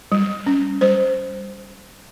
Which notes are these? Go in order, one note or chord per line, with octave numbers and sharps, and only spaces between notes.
G3
C#4
G3 C5